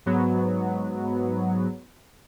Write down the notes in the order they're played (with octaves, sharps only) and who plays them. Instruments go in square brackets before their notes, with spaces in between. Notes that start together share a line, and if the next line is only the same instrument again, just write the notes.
[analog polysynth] G#2 F#3 B3